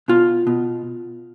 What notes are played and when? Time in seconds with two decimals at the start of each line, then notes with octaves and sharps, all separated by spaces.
0.08 B2 F4
0.47 B2